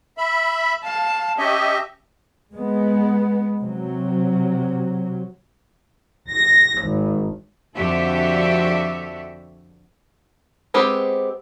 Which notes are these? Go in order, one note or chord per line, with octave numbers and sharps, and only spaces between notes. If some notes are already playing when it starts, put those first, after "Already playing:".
E5 B5
F5 A5
C#4 G4 D#5 E5
G#3 B3
C3 F#3
A#6
G#1
F2 D3 F#4 G4 A4 E5
G#3 B3 C4 G4